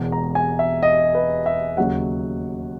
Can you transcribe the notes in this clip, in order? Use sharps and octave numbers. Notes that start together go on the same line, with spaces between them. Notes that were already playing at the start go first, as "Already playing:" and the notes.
Already playing: E1 E2 B2 G#3
A#5
G#5
E5
D#5
B4
E5
D#2 C#3 F#3 F#5